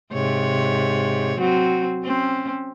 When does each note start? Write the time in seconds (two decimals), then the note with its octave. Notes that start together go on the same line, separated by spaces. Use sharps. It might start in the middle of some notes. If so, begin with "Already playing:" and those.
0.13 G#2 C3 C#5
1.38 F#3 C4 F#4
2.04 C4 C#4